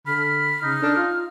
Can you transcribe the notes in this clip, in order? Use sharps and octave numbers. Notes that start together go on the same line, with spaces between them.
D3 B5 F6
C#3 D#4
D4
F4